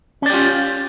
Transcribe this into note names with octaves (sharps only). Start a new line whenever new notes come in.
C#4 F4 G4 D5